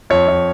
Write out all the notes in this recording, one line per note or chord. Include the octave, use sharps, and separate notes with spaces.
F2 C#5
F2